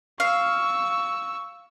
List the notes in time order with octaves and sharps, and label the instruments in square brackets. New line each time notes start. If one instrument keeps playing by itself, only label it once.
[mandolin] F5 [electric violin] C#6 E6